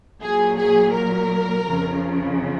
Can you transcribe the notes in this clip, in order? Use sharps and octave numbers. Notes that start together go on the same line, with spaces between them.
A#2 F#3 G#4
G#4
A#4
F2 C#3 F3